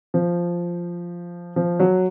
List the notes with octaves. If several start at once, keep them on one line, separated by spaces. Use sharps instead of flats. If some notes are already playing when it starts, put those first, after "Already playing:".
F3
F3
F#3